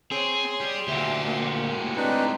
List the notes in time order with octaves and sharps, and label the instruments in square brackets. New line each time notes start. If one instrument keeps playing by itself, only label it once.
[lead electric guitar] C4 C5 [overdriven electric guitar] G#4 [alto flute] C#5 [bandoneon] C6
[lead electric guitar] G3 G4
[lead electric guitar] D2 A#2 [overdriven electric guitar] F#4 G4 [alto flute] E5
[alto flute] A#3
[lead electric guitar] A2 G#3
[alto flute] C4 [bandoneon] D4 D#4 B4